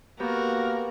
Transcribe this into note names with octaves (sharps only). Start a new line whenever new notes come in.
A#3 B3 F#4 G4 A#4